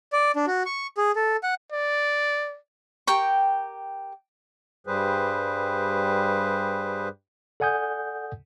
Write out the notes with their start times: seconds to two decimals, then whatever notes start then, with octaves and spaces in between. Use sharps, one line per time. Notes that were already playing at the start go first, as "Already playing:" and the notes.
0.13 D5
0.36 D4
0.47 F#4
0.66 C#6
0.97 G#4
1.16 A4
1.43 F#5
1.72 D5
3.07 G4 A#4 G5 C#6
4.87 G2 G3 G#4 B4 C5
7.60 A4 D5 F#5 G#5 D#6 G6